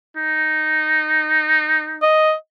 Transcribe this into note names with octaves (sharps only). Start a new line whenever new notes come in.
D#4
D#5